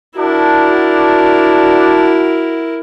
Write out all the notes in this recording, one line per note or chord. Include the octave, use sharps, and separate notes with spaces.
D4 E4 F#4 A#4